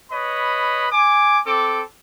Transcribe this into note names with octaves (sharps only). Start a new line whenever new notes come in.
B4 C#5 D#5 B5
G#5 D6
C4 A4 D6